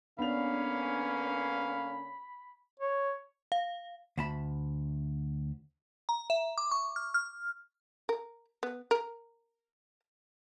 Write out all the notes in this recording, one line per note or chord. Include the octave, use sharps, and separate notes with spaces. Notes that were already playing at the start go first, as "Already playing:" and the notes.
D3 A#3 B3 C#4 D4 F5 B5 F7
C#5
F5
D2 A5 B5
A#5
E5
D6
C#6
F6
F6
A#4
B3
A#4